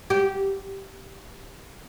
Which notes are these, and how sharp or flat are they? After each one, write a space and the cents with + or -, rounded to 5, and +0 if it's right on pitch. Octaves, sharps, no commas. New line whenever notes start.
G4 -15